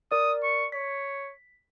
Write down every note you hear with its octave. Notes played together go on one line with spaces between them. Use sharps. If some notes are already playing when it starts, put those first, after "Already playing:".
A#4 D5 D#6
C#6
C#5 B6